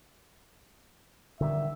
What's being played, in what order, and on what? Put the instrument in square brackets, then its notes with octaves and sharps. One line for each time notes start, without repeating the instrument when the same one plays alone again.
[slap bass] D3 D#3 G3 [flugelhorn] E5